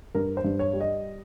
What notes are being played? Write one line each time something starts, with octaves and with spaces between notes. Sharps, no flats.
G2 A#4
C5
G2
C#5
G3
D#5